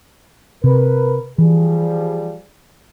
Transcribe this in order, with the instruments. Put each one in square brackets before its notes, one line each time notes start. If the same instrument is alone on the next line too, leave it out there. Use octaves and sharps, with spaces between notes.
[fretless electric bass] C3 [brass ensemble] A#4 B4
[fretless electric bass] E3 [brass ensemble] F3 G3 G#4